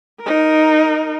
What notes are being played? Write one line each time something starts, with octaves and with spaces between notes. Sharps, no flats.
D#4 A#4